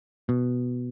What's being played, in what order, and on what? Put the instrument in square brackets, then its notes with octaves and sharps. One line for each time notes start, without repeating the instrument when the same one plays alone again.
[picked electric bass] B2